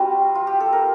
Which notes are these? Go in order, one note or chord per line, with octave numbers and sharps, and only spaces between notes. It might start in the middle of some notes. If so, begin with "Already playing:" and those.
Already playing: G3 C4 F4 F#4
F4
G4
A4
A#4